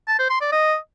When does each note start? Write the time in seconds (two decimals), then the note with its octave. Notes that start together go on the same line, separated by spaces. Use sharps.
0.08 A5
0.19 C5
0.30 C6
0.41 D5
0.52 D#5